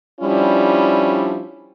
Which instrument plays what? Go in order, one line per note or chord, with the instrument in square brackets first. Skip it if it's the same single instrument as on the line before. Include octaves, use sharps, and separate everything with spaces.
[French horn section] F3 G3 C#4 D4 E4